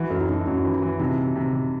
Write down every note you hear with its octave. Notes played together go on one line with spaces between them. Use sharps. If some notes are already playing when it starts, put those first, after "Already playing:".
Already playing: E3 F#4
F#2 A4
E4
F#2 D#4
F#2 C#4
E3
E4
E3
C3 D#4
C3
C3
C3